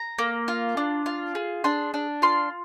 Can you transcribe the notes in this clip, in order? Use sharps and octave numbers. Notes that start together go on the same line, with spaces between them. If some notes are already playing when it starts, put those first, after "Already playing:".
Already playing: A#5
A#3
F4
D4
F4
G#4
D4 C6
D4
F4 C6